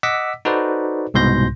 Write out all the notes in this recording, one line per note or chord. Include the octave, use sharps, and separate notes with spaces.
D#5 F#5 D6 E6 B6
D#4 F#4 A4 B4 C5 D5
C2 G#2 B2 C6 G6 A#6